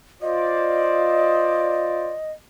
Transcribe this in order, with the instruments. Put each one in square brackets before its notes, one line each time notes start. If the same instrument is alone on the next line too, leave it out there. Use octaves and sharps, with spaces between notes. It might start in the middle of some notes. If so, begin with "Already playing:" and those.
[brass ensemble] F4 C5 D5 [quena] D#5